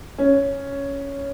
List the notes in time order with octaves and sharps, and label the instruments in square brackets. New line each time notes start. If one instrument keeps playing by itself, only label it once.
[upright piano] C#4